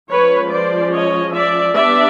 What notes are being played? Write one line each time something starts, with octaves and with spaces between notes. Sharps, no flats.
F3 G#3 C#4 B4 C#5
C5 D5
C#5 D#5
D5 E5
G3 B3 D4 D5 E5